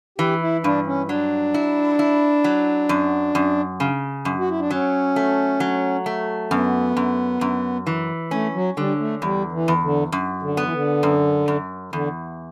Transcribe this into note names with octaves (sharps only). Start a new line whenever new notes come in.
E3 G4
E4
G2 D4
C#4
F#3 D4
E4
E4
F#3
F#2
F#2
C#3
F#2
F#4
E4
D4
F#3 C#4
A3
F#3
A3
F#2 B3
F#2
F#2
E3
A3 C#4
F#3
D3 G3
A3
E2 G3
E3
E2
D3
F#2
D3
B3
E3
D3
F#2
F#2
E2 D3